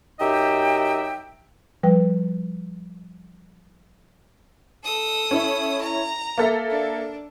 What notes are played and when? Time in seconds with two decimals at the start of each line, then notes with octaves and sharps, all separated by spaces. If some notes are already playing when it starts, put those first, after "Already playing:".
0.20 F#2 D#4 G4 D#5 E5 G5
1.83 F3 G3 B4 G5
4.82 A4 D#6
5.31 C#4 E4
5.81 A#5
6.38 A#3 A4 E5
6.70 D4